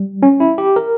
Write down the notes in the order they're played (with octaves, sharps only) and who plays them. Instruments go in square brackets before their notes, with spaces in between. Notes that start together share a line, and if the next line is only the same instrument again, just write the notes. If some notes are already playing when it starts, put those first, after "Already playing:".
Already playing: [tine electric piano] G3
C#4
E4
G4
A#4